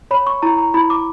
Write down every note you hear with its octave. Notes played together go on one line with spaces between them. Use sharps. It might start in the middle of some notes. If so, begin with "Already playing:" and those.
C#5 B5
C#6
E4 A#5
A#5
E4 B5
D6